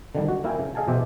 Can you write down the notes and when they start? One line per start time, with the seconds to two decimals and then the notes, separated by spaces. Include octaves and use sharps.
0.15 D3 D#3 G3
0.28 F#4
0.44 A#3 E4 A#4 G5 G#5
0.59 C#3
0.75 G#4 D#5 F5 G#5 A5
0.88 B2 E3 G4 C5 E5